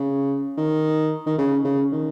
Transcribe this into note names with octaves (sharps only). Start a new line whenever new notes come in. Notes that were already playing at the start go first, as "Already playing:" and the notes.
Already playing: C#3
D#3
D#3
C#3
C#3
D#3